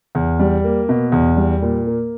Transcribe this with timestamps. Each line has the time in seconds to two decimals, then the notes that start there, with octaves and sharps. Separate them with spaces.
0.15 E2
0.39 G3
0.64 A#3
0.89 B2
1.12 E2
1.37 G3
1.62 A#2
1.87 A#3